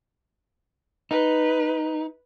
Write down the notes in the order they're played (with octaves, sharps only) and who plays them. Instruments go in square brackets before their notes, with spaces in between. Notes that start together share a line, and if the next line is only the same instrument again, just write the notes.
[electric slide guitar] D#4 [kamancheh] B4